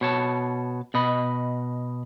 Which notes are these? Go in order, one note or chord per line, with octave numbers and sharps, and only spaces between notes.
B2 C#5 A5
B2 D#5 B5